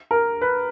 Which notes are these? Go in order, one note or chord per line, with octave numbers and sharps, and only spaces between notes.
A#4
B4